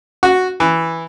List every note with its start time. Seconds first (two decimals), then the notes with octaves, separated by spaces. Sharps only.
0.23 F#4
0.60 E3